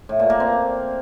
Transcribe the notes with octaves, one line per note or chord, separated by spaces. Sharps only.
A2
A#2
A#3
C4